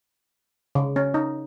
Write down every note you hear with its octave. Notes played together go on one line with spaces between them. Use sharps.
C#3
C#4
D#4